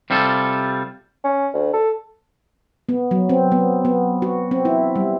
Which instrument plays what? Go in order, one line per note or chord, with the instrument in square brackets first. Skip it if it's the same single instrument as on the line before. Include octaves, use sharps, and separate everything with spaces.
[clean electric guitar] C3 G3 F4 A4
[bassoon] C#4
D2
A4
[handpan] B3
F#3
C4
B3
B3
F#4
C4
E4
G3